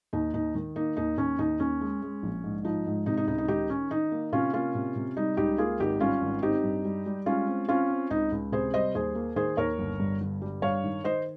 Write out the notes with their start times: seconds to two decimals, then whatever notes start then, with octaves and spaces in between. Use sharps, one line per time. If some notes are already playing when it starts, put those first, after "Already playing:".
0.13 D#2 D#4
0.34 D#2 D#4
0.55 D#3
0.76 A#3 D#4
0.97 D#2 D#4
1.17 D#2 C#4
1.39 D#2 D#4
1.59 D#2 C#4
1.81 G#3
2.02 G#3
2.23 A#1
2.44 G#2
2.64 F3 D#4
2.86 G#2
3.06 C3 D#4
3.17 D#4
3.28 C#2 D#4
3.38 D#4
3.48 D#3 D#4 G4
3.70 D#3 C#4
3.91 D#3 D#4
4.12 A#3
4.33 C3 C#4 F4
4.53 A#3 C#4 F4
4.75 C3
4.96 C3
5.17 G3 D#4
5.37 C#2 D#4 G4
5.58 A#3 F4 G#4
5.80 G#1 D#4 G4
6.00 G3 C#4 F4
6.22 G#1
6.42 C4 D#4 G4
6.63 G2
6.85 G3
7.06 G3
7.26 G#3 C#4 F4
7.47 C4
7.68 C4 C#4 F4
7.90 C4
8.10 C#2 D#4
8.32 C#2
8.52 C3 G#4 C5
8.74 G3 C5 D#5
8.95 D#2 G#4 C5
9.15 A#3
9.36 D#3 G#4 C5
9.57 D#2 A#4 C#5
9.79 G1
10.00 G2
10.21 G1
10.42 G3
10.62 G2 C#5 F5
10.83 D#3
11.04 D#3 C5 D#5